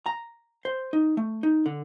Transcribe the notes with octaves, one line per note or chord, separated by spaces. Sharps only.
A#5
C5
D#4
A3
D#4
D3